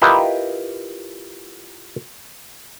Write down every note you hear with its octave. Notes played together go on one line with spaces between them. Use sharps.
E4 F4 G4 A#4 B4 D#5